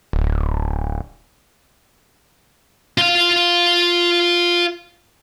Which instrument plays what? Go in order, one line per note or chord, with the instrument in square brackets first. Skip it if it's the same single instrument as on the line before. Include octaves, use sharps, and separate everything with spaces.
[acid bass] D1
[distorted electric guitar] F4 F5